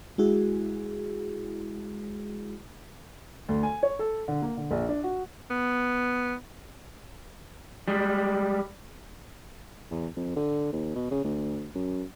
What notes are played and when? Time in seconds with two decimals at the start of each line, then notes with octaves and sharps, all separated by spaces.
0.18 G#3 E4 F#4 G#4
3.49 D2
3.63 G#5
3.83 C#5
3.99 A4
4.28 D3
4.42 A#3
4.57 D3
4.71 A#1
4.89 D4
5.04 F#4
5.50 B3
7.88 G3 G#3
9.91 E2
10.17 F2
10.36 D3
10.73 D#2
10.96 B2
11.11 C#3
11.25 D2
11.75 F#2